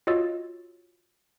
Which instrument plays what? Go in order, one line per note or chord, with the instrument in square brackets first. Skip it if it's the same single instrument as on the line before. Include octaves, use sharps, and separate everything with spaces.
[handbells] F4 F#4 C#5 D#5 E6 A6